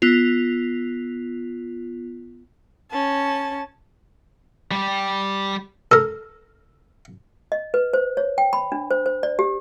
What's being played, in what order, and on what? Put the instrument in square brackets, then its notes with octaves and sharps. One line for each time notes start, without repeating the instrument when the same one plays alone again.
[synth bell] B3 F4
[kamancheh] C#4 A5
[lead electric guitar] G3 G4
[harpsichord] A4 A#4
[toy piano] D#5
B4
C5
C#5
G5
B5
D4
C5
C5
D5
G4